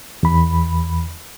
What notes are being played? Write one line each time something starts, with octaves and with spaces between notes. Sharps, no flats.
E2 B5